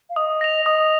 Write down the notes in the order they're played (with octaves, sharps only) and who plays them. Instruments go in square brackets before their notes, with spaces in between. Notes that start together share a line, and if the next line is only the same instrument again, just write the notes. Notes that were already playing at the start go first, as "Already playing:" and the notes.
[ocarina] F5
[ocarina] D#5 [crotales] D#6
[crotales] A#6 F7
[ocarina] D#5 [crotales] D#6